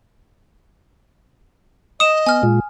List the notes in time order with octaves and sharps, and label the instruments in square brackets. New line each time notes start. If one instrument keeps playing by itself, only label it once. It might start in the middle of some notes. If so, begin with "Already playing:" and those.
[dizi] D#5 [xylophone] D#6 E7
[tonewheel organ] B3 [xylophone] G#5 F6
[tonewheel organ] A#2 G#3 F4